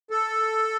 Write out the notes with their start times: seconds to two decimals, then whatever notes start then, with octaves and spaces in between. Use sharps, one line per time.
0.10 A4